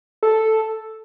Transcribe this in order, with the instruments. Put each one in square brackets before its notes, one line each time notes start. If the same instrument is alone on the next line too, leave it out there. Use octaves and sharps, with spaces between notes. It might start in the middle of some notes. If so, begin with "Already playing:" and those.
[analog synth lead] A4